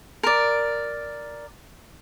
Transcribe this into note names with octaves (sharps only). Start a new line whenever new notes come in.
A#4 D5